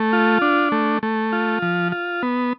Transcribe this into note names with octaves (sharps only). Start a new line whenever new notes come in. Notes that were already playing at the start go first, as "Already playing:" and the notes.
Already playing: A3
F4
D4
A3
A3
F4
F3
F4
B3